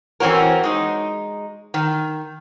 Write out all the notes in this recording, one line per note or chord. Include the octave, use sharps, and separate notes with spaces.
E3 C4 C#4 F#4 A#4
G#3 D#4
D#3